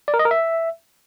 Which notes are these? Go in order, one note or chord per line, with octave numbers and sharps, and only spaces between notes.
D5
A#4
D#5
A#4
E5